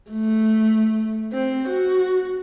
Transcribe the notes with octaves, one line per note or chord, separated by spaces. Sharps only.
A3
C4
F#4